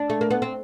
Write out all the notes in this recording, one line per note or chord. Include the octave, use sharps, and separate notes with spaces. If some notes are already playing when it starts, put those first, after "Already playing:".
Already playing: D4
A3
A#3
B3
C4